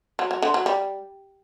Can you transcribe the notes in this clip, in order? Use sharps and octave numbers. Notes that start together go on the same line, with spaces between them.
F#3
F#3
D3
F#3
G3